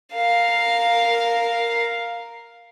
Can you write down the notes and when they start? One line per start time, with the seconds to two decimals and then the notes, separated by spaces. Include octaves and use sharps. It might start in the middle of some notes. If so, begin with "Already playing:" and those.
0.14 A#4 F5